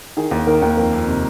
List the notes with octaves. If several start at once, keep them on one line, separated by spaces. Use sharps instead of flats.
D#3 G#4
D#2
D#3 A#4
D#2
F2 A#4
F2
C3